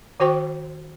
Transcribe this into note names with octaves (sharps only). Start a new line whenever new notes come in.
D#3 F#4 C5 G5 C#6